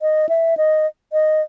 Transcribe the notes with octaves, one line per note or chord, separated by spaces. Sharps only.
D#5
E5
D#5
D#5